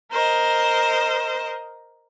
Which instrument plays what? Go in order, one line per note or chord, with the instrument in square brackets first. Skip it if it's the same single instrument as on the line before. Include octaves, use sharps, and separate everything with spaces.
[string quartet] A#4 C5 D#5